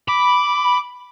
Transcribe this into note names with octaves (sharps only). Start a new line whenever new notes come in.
B5 D6